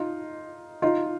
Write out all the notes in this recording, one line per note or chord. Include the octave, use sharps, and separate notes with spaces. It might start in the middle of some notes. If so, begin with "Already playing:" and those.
Already playing: D#4 F4
D#4 F4